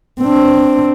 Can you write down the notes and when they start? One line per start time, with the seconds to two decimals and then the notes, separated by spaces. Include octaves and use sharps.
0.21 C4 D4